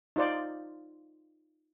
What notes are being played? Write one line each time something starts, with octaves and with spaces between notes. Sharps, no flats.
D#4 F4 C5 D5